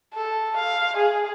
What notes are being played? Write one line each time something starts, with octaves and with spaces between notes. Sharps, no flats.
A4
F5
G#4